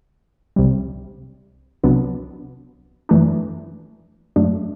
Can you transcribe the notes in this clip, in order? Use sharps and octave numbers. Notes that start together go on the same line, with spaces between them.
C2 C3 G3
C2 C3 F#3 B3 D4
F#2 E3 A3 D4
F#2 F#3 A3 D4